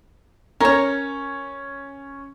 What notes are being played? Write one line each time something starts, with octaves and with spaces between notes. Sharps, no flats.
C#4 A#4 C#5